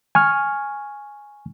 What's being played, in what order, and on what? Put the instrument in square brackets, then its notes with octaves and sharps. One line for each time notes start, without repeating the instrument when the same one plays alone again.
[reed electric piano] G#5 C#6 F6